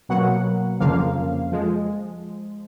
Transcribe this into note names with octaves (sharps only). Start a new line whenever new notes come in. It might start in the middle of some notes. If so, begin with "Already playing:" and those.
B2 F#3 A#3 F#5
F2 C#3 F3 A#3 F5
F3 G#3